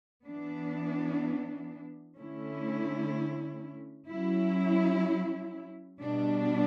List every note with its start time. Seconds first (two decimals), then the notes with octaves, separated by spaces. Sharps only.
0.25 E3 B3 D4
2.18 D3 A3 C#4 E4
4.09 F#3 C#4 E4
6.01 B2 G3 D4